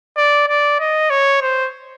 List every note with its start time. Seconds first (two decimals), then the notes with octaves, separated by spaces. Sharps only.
0.17 D5
0.48 D5
0.80 D#5
1.10 C#5
1.42 C5